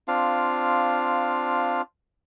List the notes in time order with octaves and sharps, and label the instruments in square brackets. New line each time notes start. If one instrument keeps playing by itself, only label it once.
[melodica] C4 D4 F4 F5